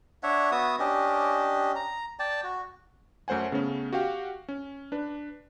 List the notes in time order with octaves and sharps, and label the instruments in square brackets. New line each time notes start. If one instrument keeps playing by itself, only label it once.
[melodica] D4 C#5 E5 F#5
B3 F#4 E5 D#6
C#4 D4 G4 D#5
A#5
D5 G5 A5
F#4
[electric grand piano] F#2 A3 C5 F#5 G#5
C#3 A3 B3 C#4
F#4 G4 F5 G5
C#4
D4 B4